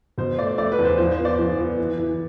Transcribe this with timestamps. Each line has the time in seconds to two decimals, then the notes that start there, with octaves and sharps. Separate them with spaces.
0.18 B2 C5
0.38 A3 D5
0.58 A3 D5
0.72 B4
0.79 E2
0.85 C5
0.98 F3 C5
1.11 C5
1.18 B3
1.25 D5
1.39 F3
1.58 B3
1.78 E3
1.98 E3